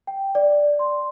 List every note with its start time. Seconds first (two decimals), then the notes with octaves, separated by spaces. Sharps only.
0.07 G5
0.35 D5
0.79 C6